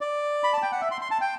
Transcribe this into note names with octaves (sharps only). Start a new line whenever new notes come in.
D5
B5
A5
G5
F#5
E5
C6
C6
A5
G5